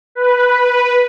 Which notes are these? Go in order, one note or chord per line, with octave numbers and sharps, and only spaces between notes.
B4